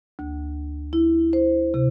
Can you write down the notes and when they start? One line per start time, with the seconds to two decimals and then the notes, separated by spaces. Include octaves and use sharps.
0.19 D2
0.93 E4
1.33 C5
1.74 C3